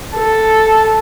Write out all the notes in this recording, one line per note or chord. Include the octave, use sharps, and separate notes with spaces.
A4